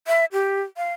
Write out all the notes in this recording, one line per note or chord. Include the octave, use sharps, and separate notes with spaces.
E5
G4
F5